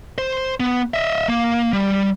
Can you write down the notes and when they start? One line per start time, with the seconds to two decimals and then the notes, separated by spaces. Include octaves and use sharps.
0.18 C5
0.60 B3
0.94 D#5 E5
1.28 A#3
1.73 G3